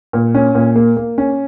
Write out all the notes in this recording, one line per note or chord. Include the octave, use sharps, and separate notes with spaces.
A#2
C#4
A#2
A#3
A#3
C#4